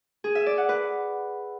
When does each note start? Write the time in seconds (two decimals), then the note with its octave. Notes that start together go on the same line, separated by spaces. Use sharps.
0.24 G#4
0.35 E5
0.46 D5
0.58 F#5
0.69 B4